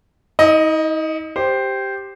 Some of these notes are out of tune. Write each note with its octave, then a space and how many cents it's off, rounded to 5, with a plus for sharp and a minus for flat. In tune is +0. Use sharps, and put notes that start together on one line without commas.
D#4 +45 D#5 +0
G4 +0 C5 +0